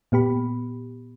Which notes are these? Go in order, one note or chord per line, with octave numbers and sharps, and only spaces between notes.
A#2 B3 G4 B5